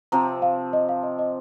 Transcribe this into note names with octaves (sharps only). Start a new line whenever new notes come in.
C3 F3 C4 A#5
F5
D#5
F5
D#5
D#5